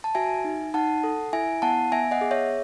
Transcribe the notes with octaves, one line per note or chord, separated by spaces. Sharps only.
A5
F#4 E5 G#5
D#4
D#4 F#5 A5
A4
E4 E5 G#5
B3 F#5 A5
B3 E5 G#5
D#5 F#5
G#4
C#5 E5